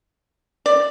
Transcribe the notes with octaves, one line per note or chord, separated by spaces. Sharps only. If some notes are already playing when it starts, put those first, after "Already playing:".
D5